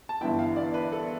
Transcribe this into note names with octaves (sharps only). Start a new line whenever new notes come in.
A5
G1 G2 E3 B3 E4 G5
F5
D5
B4
A4